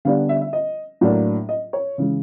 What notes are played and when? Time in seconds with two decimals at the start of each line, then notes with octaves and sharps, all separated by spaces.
0.05 D3 G3 B3 D4 F5
0.29 E5
0.41 E5
0.53 D#5
1.01 A2 F#3 A#3 D4
1.49 D#5
1.73 C#5
1.98 C#3 E3 G#3